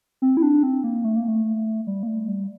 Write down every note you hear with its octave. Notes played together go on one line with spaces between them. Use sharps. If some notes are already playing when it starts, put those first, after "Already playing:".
C4
E4
D4
C4
A#3
A3
A#3
A3
G3
A#3
A3
G3